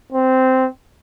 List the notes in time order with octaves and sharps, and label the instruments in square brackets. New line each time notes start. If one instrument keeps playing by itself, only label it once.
[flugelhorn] C4